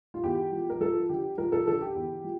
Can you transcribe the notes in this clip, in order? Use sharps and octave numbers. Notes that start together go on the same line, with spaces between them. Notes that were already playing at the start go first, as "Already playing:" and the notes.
F4
E2 G4
F3
A#4
F3 A4
D3 G4
F3 A#4
A4
D3 A4
G4
E2
F3